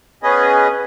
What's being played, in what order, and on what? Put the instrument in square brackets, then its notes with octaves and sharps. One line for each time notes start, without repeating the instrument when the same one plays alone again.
[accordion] B3 C#4 G#4 B4 D#5